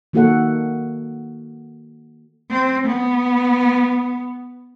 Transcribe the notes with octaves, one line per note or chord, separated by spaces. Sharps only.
D#3 A#3 F#4 A4 F#5
C4
B3